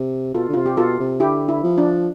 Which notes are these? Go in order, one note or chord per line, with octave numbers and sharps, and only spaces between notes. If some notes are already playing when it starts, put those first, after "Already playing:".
Already playing: C3
B2 F4 A4
D3
C3 F4
G4
B2 F4 A4
C3
D3 E4 G4
E4
F3
D4